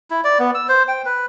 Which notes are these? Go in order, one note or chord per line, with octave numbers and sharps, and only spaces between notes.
E4
D5
B3
E6
C5
G5
B4